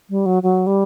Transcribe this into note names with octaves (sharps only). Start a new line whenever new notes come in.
G3
F#3
F#3
G3